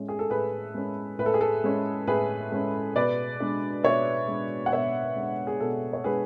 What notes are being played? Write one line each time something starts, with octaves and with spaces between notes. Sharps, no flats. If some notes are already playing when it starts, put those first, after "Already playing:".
Already playing: A2 G#3 C#4
G#4
A4
A2 G#4 B4
G#3 C#4
A2 B4
A4
G#4
A4
G#3 C#4
A2 G#4 B4
G#3 C#4
B2 B4 D5
G#3 B3 D4
B2 C#5 E5
G#3 B3 D4
F#5
B2 C#5 E5
G#3 B3 D4
G#4
B2 A4
C#5
G#3 B3 D4 G#4 B4